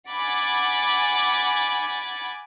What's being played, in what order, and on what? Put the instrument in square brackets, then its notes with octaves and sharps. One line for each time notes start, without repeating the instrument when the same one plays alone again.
[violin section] F#5 G#5 B5 D6 G#6 A6